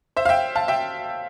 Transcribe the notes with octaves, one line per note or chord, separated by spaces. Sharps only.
C5 E5
F5
E5 G5
F5 A5
E5 G5